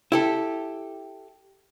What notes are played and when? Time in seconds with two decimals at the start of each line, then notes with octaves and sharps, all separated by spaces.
0.12 E4 G4 A4